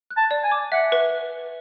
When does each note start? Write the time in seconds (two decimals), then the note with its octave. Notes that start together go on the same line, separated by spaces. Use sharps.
0.10 F#6
0.17 A5
0.31 D5
0.44 G#5
0.52 D6
0.72 E5 F#5
0.92 B4